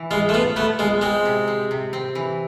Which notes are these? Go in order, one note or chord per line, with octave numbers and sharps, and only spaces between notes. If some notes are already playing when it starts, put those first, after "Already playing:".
Already playing: E3
G#3 F4
A3
B3 F4
A3 B3
G#3 F4
G#3 C4
C3
C4
C3
C4
E3